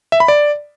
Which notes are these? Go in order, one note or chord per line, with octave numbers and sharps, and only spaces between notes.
E5
B5
D5